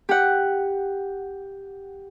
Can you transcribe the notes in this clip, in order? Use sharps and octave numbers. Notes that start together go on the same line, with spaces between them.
G4 F#5